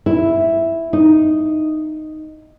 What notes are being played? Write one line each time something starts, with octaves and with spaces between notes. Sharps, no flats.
E4
D#4